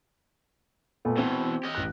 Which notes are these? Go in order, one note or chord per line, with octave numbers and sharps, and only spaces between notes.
A#2 A3 B3
B2 E3 C4
G4 D#5
A1 F#6